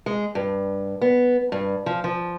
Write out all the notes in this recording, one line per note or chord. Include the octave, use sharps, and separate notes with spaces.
G#3
G2
B3
G2
F3
F3